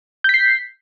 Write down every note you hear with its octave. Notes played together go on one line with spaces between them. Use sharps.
G6 B6 C7